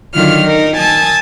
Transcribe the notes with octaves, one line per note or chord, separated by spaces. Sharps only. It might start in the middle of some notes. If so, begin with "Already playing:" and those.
D3 D#3 F#3 F4 F6
D#4 A#4
G#5 A5 D#6 E6